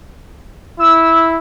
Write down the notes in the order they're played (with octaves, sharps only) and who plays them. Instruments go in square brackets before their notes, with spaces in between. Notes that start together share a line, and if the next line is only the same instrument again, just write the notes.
[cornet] E4 [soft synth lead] E6